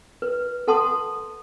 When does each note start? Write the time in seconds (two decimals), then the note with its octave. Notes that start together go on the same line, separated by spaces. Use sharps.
0.22 B4
0.68 A4 F#5 A5 C6 D#6